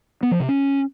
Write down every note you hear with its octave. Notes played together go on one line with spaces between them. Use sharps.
B3
F3
C3
C#4